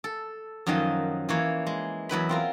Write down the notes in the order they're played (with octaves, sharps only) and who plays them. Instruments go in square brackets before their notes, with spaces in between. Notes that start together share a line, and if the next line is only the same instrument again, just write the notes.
[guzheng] A4
F#2 D#3 F3 F#3 D#5
E3 A#3 C#5
G#3
E2 F#3 B4 B5
C4 F4 A#4